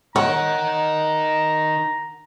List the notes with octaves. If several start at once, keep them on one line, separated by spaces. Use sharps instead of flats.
D#4 A#4 C#5 F#5 A#5